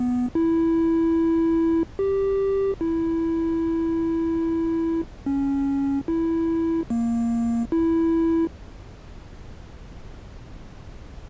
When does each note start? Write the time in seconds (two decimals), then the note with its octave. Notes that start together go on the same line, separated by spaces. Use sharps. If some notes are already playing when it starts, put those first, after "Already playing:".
Already playing: B3
0.35 E4
1.99 G4
2.81 E4
5.26 C#4
6.08 E4
6.90 A#3
7.72 E4